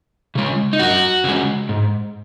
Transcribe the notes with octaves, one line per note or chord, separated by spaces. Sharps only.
C#3 G#3
D#4
F#2 F#4
C#3 G#3
G#2